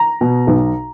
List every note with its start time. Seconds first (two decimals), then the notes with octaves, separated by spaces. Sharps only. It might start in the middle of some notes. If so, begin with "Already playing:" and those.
Already playing: A#5
0.21 B2
0.47 B1